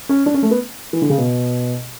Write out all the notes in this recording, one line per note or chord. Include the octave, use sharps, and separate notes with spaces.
C#4
D4
C#4
A3
B3
E3
D3
C#3
B2